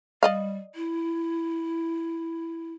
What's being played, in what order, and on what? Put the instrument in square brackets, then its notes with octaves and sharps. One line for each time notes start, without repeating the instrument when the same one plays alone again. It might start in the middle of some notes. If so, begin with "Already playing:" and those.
[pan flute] G3 [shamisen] D5 D#5 F5
[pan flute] E4